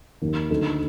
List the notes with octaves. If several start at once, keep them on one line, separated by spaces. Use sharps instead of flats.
D#2 D#3 A#3
D2 D3 A3 D#4